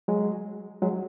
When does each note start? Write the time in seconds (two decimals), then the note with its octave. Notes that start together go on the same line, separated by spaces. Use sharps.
0.08 F#3 G#3
0.82 F#3 G#3